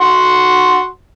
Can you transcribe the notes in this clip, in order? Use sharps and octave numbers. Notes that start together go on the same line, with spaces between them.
F#4 F#5 C6